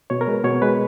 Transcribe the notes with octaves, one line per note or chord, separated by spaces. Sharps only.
B2 C#5
A#4
G#3 B4
B2 C#5
G#3 B4